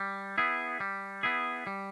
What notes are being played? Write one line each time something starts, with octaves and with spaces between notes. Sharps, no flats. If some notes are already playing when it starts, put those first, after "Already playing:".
Already playing: G3
B3 E4 G#4
G3
B3 E4 G#4
G3